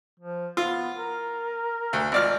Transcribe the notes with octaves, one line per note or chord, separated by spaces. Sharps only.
F3
B3 F4
A#4
D2
G#1 F4 D5 F6